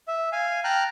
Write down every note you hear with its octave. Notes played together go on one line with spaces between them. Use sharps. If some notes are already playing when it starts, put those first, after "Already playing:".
E5
F5 G#5
G5 A5 A#5 F6 F#6